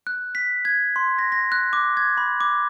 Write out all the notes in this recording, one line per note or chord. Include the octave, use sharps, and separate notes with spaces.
F#6
B6
G#6
C6
A#6
A#6
F#6
D6
G#6
B5
D6